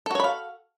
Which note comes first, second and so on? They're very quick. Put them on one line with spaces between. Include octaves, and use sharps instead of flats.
A4 F#4 C#5 B5 F5